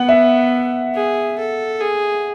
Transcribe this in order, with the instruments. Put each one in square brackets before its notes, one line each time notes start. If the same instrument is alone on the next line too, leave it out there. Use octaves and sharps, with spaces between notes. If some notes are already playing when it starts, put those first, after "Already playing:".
Already playing: [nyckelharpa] B3 [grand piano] F#5
[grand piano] E5
[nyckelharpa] G#4
A4
G#4